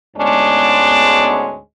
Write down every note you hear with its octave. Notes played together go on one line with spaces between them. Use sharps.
D2 G#2 G#3 B3 C#4 D4